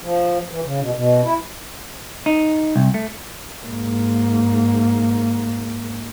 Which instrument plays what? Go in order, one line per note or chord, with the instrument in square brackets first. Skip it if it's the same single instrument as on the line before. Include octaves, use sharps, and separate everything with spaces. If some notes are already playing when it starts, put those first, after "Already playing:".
[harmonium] F3
E3
C#3
B2
B2
E4
[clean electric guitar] D#4
C2
A3
[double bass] G#2 A#3